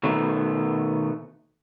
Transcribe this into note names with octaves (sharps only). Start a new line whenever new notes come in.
B2 D#3 A3 B3